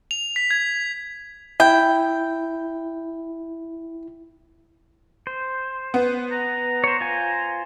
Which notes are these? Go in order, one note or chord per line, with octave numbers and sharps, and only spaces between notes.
F7
B6
G#6
E4 G5
C5
B3
A#5
C5 C#5
F4 C5 G#5